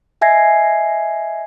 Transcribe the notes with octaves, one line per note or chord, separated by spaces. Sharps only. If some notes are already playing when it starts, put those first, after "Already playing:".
D#5 E5 G#5 G#6 A#6 C7